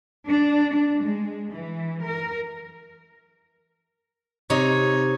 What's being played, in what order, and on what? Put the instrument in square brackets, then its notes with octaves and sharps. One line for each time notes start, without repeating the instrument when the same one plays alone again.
[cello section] D4
D4
G#3
E3
A#4
[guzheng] C3 D#4 [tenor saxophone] C#5